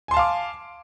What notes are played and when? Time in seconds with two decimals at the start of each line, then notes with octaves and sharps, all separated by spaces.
0.08 G#5
0.11 C6
0.14 A5
0.17 F5
0.19 D6